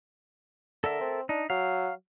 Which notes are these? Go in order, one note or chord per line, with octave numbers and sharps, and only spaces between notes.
D3 A4 A#4 E5
C4
D4 D#4
F#3 F5